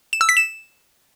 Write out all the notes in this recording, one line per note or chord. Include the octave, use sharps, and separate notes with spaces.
E7
E6
B6
E7